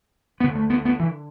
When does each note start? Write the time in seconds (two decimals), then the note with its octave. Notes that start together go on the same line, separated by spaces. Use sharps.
0.40 D2 B3
0.44 D3
0.55 A3
0.70 B3
0.85 B3
1.00 E3